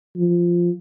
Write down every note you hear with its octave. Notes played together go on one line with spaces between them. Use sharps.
F3